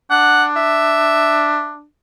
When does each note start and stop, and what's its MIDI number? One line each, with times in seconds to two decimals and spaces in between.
0.11 1.85 62
0.11 0.44 78
0.56 1.73 76